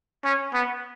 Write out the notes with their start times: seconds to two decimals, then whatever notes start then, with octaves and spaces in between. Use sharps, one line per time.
0.25 C#4
0.54 B3